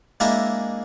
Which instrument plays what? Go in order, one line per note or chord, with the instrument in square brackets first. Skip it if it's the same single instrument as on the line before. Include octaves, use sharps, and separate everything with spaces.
[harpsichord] G#3 A#3 D4 E4 A#4 E5